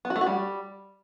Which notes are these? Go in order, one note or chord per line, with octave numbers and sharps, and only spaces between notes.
B3
F#4
A3
F#4
G3